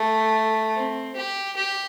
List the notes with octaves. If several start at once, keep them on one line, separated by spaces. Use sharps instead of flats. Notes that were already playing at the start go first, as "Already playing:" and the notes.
Already playing: A3
C4
G4
G4